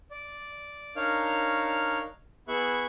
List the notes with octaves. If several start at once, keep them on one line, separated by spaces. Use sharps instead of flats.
D5
D4 D#4 A#4 C#5 F5 F6
B3 E4 G#4 E5 C#6 F#6